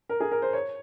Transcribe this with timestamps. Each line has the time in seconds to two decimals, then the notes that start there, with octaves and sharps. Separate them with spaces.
0.09 A#4
0.20 G#4
0.32 A#4
0.42 C5
0.53 C#5